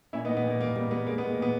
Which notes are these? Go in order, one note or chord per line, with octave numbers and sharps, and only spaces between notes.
A#2 C#4 E4
B3 D#4
A#2
B3
A#2 A#3
G3 A#3
G3 A#3
G3 B3
G#3 A#3
B3
G#3
A#3
A#2 B3